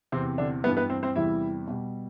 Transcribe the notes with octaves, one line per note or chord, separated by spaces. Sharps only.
E2 C3 E3 C4
D3 D4
G2 E3 G3 B3 B4
B3 B4
C4 C5
C4 C5
E2 C3 E3 G3 E4 E5
B2 G3